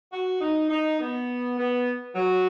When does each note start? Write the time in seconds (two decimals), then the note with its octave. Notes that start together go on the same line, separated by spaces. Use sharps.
0.12 F#4
0.40 D#4
0.69 D#4
0.99 B3
1.58 B3
2.15 F#3